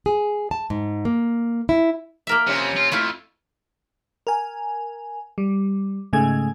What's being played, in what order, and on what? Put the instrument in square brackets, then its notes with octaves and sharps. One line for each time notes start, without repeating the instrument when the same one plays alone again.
[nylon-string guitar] G#4
A5
G#2
A#3
E4
[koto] A#3 A#4 E5
[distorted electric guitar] F2 [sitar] C3 C#4
[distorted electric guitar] F4
[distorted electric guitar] F2 [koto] A3 E4 F4
[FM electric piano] A#4 G#5
G3
G#2 C#3 G#3 A3 G#5 G#6